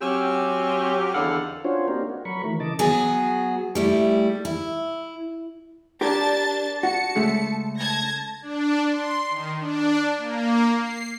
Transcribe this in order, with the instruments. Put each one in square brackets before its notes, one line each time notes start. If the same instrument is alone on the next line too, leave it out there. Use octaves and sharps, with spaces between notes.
[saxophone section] F#3 C4 C#4 G4
E2 D3 D#3 A4 F5 F#5
[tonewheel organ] C#4 D4 F4 F#4 C5 C#5
A#3 C4 D4 D#4 G4 A#4
F#4
F#3 A#4 B5 C#6
D#3 E3 A3 A#4
C#3 E3 D#5 A5 D6
[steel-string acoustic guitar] F#3 B3 F#4 G#4
G3 A3 E4
E4
[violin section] D4 A5 A6 [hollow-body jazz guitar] G4 A#4
[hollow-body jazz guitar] F#4 [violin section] A5 C#7
[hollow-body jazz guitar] C#3 G#3 A3
[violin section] A5 G#6 A#6
[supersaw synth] D4
C6
D#3
D4
A#3
C7